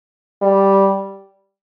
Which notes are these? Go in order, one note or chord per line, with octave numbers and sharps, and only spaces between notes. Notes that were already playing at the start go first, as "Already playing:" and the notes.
G3